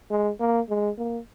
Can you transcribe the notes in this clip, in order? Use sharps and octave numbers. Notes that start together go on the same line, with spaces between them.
G#3
A#3
G#3
A#3